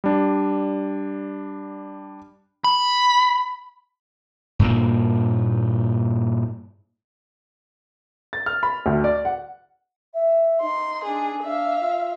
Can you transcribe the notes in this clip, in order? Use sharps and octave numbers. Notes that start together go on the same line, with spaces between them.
G3 D4
B5
G2 A#2 A#3
A6
F6
B5
D2
D5
F#5
E5
D#4 C6
D4 G#4
D4 E5 F5
F4